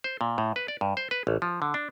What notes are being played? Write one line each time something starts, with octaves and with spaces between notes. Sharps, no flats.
C5
A#2
A2
B4
D5
G2
C5
B4
A1
F3
D3
D4